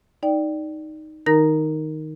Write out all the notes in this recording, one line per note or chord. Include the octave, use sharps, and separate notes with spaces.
D#4 D5 G5
D#3 D#4 A#4 A#5 A#6